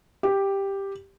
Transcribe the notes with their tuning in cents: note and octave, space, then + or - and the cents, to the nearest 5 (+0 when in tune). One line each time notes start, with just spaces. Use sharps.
G4 +5